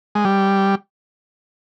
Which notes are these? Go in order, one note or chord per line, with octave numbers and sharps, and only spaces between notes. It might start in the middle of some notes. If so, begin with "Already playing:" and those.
G#3
G3